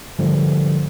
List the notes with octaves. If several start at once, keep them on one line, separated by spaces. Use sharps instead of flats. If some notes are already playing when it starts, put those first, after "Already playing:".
G#2 D3 F3 G3 A3